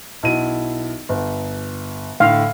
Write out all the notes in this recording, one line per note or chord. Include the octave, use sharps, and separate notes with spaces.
B1 E4 D#7
G1
A2 D3 F5